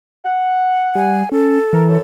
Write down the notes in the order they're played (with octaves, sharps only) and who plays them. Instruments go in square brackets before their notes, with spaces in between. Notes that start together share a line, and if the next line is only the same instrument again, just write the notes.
[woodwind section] F#5
[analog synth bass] G3 [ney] G#5
[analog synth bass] C#4 [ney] A4
[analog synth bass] E3 [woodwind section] A#4
[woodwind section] F#2